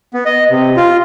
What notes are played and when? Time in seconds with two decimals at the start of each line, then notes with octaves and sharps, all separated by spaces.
0.14 B3
0.25 D#5
0.50 C3
0.77 F4